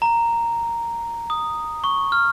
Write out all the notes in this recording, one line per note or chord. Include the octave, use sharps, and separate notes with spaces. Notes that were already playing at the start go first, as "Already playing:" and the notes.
A#5
D#6
C#6
F6